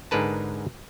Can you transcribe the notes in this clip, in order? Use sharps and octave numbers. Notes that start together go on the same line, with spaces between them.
G#2 D3 G#3 A#4 B4 A5